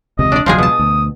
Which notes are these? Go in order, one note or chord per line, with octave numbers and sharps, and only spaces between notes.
E1 C#2 C3 D#5
D4 D5
E1 C#2 F3 F#3 G#3 G#4 C6
B2 A5 D#6
D2